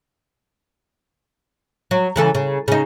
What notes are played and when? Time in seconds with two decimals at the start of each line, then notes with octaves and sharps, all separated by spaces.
1.91 F#3
2.16 C#3 E3 A4
2.35 C#3
2.68 C#3 D#4